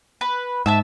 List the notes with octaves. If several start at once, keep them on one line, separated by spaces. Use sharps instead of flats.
B4
G#2 E5 A5 E6